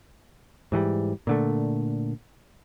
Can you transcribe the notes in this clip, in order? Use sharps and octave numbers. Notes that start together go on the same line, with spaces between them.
G#2 E3 F3 G3
A#2 D3 A3